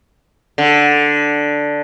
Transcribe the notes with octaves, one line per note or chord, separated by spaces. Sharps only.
D3